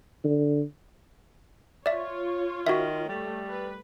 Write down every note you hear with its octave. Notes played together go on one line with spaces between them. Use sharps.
D3
F4 C#5 D5 E5
D#3 F#4 E5
G3 A3
B4